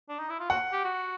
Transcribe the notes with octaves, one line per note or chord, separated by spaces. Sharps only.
D4
D#4
E4
F4
F#4 F#5
G4
F#4